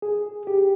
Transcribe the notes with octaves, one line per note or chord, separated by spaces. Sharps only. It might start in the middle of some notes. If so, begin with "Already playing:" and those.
G#4
G4